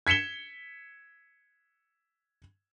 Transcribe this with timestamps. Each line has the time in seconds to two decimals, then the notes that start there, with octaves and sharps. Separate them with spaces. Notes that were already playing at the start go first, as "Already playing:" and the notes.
0.07 G#6 B6 C#7 E7 G7